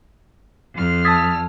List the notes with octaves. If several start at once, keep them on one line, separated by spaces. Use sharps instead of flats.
F2 F6
A5 D#6 E6 G#6 A6 B6